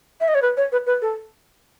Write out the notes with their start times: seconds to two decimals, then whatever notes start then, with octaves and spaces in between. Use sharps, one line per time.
0.21 E5
0.28 D#5
0.35 C#5
0.42 B4
0.57 C#5
0.72 B4
0.86 B4
1.02 A4